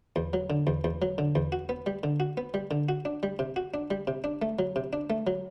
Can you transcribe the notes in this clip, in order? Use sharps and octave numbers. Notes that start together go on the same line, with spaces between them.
E2
F#3
D3
E2
E2
F#3
D3
E2
F#4
B3
G3
D3
F#4
B3
G3
D3
F#4
D4
G3
C3
F#4
D4
G3
C3
D4
A3
F#3
C3
D4
A3
F#3